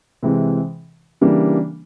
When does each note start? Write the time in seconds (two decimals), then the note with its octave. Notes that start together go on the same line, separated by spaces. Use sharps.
0.23 C3 E3 G#3
1.21 C#3 E3 G3 A#3 D4